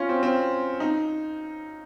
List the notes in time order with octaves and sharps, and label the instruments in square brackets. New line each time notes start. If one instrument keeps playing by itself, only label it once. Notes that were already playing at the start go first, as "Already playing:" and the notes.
Already playing: [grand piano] C#4 F4
C4
C4
D#4